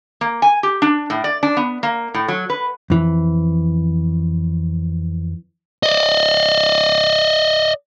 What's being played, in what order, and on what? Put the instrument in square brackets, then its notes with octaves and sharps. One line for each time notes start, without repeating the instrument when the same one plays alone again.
[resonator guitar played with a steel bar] A#3
G#5
G4
D4
A2
D5
D4
B3
A#3
A2
F#3
B4
[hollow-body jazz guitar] F2 E3
[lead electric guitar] D5 D#5